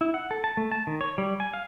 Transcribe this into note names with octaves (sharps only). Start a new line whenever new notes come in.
E4
F#5
A4
A5
A3
A5
D#3
C#5
G3
G#5
F5